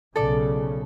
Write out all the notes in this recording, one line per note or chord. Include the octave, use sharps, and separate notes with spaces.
B1 C#3 A4 D5